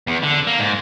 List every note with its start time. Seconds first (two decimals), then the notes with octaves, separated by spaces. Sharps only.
0.07 E2
0.23 D3
0.47 A#3
0.59 G#2